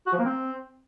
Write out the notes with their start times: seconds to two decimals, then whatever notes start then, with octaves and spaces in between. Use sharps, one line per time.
0.06 F#4
0.13 F3
0.19 A#3
0.25 C4